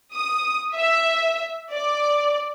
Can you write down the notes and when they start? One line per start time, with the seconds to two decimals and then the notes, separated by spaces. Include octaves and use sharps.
0.13 D#6
0.74 E5
1.71 D5